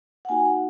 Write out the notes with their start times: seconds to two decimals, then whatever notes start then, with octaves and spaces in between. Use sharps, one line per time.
0.25 F#5
0.29 A#3 D#4 F#4 G#5
0.46 F#5